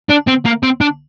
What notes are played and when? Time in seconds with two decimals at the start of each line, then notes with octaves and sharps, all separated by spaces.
0.09 D4
0.27 C4
0.45 A#3
0.63 C4
0.81 D4